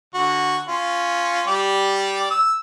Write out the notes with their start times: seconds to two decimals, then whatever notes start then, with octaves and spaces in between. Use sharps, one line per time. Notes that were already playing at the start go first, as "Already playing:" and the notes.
0.15 D3 F#4
0.68 C#4 F4
1.48 G3 G4 D5
2.30 E6